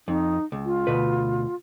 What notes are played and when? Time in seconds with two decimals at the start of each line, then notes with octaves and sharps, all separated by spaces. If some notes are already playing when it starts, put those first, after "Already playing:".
0.08 F2 D#4
0.52 C#2
0.65 F4
0.87 D2 B2 B4